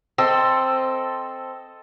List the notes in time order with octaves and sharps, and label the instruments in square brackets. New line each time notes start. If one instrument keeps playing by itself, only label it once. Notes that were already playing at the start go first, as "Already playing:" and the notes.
[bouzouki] C4 [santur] A4 D#5